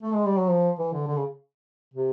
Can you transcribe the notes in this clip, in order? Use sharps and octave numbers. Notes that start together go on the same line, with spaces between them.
A3
G#3
G3
F#3
F3
E3
D3
D3
C#3
C3